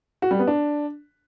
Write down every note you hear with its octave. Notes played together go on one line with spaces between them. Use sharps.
F#4
G3
B3
D4